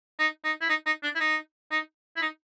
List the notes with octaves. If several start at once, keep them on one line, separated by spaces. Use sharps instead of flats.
D#4
D#4
E4
D#4
D#4
D4
E4
D#4
D#4
E4
D#4